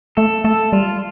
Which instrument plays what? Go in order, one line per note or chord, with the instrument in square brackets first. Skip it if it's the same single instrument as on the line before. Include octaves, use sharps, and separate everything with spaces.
[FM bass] A3 [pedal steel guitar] A4
[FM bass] A3 [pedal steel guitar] A4
[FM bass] G3 [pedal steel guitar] F4